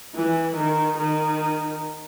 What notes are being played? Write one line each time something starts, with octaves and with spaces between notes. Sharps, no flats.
E3
D#3
D#3